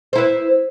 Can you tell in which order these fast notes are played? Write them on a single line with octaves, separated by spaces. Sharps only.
C5 E4 B4